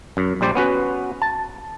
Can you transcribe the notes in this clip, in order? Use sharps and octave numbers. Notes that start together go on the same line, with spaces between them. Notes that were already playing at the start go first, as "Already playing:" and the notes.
F#2
A#1 G3 C5 D5
B3 C#4 F#4 B4
A5